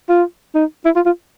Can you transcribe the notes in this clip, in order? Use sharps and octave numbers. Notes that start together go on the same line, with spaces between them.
F4
D#4
E4
F4
F4